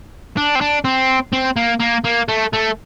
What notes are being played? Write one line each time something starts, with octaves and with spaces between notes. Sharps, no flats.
D4
C4
D4
C4
C4
A#3
A#3
A#3
A3
A3